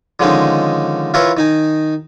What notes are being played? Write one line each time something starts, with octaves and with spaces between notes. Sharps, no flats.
D3 D#3 F3 G#3 C#4 D#4
E3 E4 F4 A#4 B4 C#5
D#3 D#4 G#5